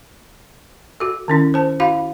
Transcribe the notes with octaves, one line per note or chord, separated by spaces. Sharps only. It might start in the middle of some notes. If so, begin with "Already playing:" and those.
F#4 A4
D#3 C#4 E4
C5 A5
E4 F#4 F5 B5